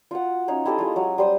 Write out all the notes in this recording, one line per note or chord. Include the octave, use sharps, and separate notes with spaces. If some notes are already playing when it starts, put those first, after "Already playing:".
F4 F#4 F#5
C#4 D#4 F5
E4 G4 A4 D#5
G#3 F4
F#3
G3 C5 D#6